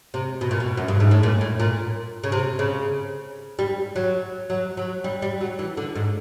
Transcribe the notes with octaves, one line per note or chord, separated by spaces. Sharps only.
C3
B2
A#2
B2
F#2
G2
G#2
A2
A#2
A2
A#2
C#3
C3
C#3
G3
F#3
F#3
F#3
G3
G3
F#3
E3
D3
G#2